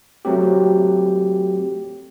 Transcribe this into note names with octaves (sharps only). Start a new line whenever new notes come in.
F#3 A3 C4 G4